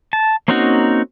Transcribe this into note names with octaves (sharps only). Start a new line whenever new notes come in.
A5
A#3 C4 C#4 D#4 F#4